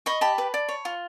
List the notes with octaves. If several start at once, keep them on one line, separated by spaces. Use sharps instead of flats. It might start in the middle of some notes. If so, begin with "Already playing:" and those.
D#5 B5 C#6
G4 A5 B5
B4
D5
C#5
F4